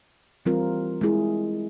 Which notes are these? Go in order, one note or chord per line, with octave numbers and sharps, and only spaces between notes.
E3 G3 C4 F4 A#4
G#3 E4 G#4